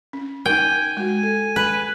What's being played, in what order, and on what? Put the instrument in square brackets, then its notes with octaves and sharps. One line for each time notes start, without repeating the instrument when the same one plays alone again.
[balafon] C#4
[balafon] D#4 A#4 [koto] G5 [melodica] G#5
[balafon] G#3 F#4
A4
[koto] B4